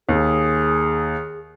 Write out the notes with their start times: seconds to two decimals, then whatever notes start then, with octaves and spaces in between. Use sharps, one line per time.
0.09 D#2 G#4